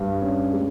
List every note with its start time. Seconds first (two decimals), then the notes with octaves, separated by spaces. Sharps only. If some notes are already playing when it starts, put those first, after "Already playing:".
Already playing: G2
0.21 C#4
0.53 G#3